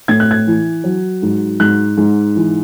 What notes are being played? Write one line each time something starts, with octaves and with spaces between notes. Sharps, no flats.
A2 G#6
F#6
G#6
E3
F#3
G#2
G#2 F#6
G#2
E3